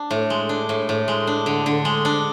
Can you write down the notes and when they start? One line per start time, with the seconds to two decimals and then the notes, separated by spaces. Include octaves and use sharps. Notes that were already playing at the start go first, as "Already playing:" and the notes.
Already playing: D4
0.11 A2
0.30 G#3
0.49 D4
0.69 A2
0.89 A2
1.08 G#3
1.27 D4
1.46 D3
1.66 D3
1.85 G#3
2.05 D4